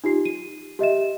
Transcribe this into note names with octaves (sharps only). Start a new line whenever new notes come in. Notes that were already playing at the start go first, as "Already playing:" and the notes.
D#4 F4 G4 C7
D#7
G4 D#5 E5 E7